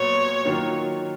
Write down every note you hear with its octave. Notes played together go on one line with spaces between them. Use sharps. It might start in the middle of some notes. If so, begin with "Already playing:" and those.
Already playing: A#2 F#3 B3 C#5
D#3 F#3 A#3 F4